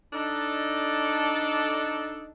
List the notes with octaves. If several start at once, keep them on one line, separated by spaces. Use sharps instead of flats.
D4 D#4 A4